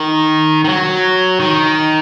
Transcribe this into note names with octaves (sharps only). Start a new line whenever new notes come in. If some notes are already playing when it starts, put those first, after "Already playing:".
Already playing: D#3
D#3
F#3
D#3